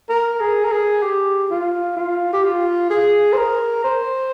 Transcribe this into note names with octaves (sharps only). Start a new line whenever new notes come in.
A#4
G#4
A#4
G#4
G4
F4
F4
G4
F4
G#4
C5
A#4
C5